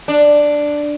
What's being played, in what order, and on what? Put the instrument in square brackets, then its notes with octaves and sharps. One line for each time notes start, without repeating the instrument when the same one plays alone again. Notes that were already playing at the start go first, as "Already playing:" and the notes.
[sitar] D4